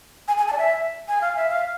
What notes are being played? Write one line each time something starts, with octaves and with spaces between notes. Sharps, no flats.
G#5
G#5
A5
D5
E5
G#5
F5
E5
F5